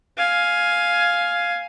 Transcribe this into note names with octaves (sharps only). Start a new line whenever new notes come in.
F5 G#5